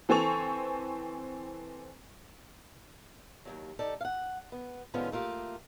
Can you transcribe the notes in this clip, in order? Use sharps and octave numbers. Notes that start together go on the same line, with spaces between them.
E3 C4 A4 G#5 C#6 F7
D#2 G#2 F#3
D#4 G4 A4 D5
F5 F#5
B3
G#2 D3 F3 B3 C#4 F4
A3 A#3 F4 G4